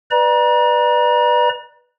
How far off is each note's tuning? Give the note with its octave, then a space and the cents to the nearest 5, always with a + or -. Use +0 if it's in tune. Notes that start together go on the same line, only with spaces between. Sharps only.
B4 +0 D5 +25 A#5 +35